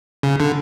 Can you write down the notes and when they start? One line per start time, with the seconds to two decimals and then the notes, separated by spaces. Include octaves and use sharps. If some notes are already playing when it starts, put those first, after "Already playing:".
0.23 C#3
0.40 D3